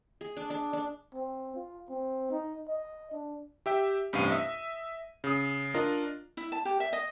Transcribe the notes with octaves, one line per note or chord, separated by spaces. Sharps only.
G#4
D4
D4
D4
C4
F4
C4
D#4
D#5
D4
G4 E5 G5
A1 G2 C3 F5 D#7
D#5 E5
C#3 D#6
D4 F4 A#4 D#5
E4
A5
G4
E5
D#5